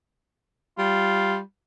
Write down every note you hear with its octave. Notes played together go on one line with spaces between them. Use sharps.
G3 F4